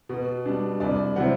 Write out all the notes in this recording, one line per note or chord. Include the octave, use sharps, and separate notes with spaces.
B2
G3 D4
C2 D5
C3 F#3 C4 E4 F#5